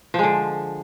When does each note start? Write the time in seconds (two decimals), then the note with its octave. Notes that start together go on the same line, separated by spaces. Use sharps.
0.14 F3
0.19 G#3
0.23 D3